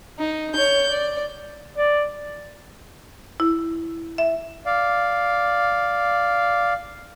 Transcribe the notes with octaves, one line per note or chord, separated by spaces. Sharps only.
D#4
C#5 G6
D5
D5
E4
E5
D5 F5